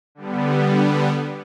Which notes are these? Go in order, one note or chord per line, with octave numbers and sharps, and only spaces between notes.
D3 G3 B3